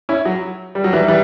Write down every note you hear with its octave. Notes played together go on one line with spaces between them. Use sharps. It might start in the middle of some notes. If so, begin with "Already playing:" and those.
C#4 E4
F#3
G3
F#3
E3 G3
E3 G3